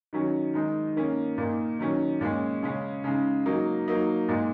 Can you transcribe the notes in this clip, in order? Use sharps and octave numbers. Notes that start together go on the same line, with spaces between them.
D#3 F#3 C#4
D#3 G#3 D#4
D#3 A#3 C#4
A#2 A#3 D#4
D#3 F#3 C#4
A#2 G#3 C#4
C#3 G#3 C#4
C#3 G#3 D#4
F#3 A#3 D#4
F#3 A#3 D#4
A#2 G#3 D#4